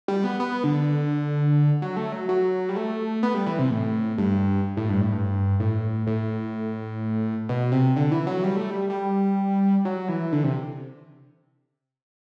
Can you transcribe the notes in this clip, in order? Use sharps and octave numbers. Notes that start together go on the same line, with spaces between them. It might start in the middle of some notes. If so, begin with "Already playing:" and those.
G3
B3
B3
D3
F#3
A3
F#3
F#3
G3
A3
B3
G3
E3
C3
A2
G2
A2
G2
A2
G2
A2
A2
B2
C3
D3
E3
F#3
G3
A3
G3
G3
F#3
E3
D3
C3